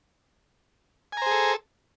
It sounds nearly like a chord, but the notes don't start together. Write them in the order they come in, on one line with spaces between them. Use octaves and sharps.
G#5 A#5 C5 G#4 A4